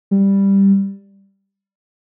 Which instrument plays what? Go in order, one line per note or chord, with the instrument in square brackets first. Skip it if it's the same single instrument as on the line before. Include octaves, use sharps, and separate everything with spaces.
[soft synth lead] G3